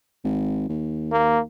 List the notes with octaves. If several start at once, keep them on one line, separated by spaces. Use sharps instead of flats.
G#1
D#2
A#3